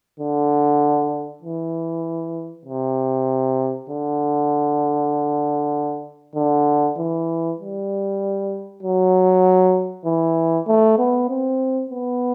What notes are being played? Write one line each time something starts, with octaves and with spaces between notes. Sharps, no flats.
D3
E3
C3
D3
D3
E3
G3
F#3
E3
A3
B3
C4
B3